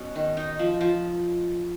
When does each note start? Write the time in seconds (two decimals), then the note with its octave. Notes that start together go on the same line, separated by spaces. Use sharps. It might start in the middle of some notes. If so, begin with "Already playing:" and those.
Already playing: B2 C#4
0.16 D#3
0.37 D#4
0.59 F3
0.81 F3